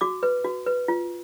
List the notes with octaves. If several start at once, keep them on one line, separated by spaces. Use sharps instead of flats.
F#4 D6
B4
F#4
B4
F4